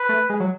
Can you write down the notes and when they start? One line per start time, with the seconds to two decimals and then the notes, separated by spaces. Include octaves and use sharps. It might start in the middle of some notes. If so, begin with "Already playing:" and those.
Already playing: B4
0.09 A3
0.29 G#3
0.40 F#3